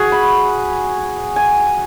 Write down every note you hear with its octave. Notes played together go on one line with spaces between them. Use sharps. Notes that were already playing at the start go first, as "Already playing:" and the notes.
Already playing: F#4 G#4
B5
G#5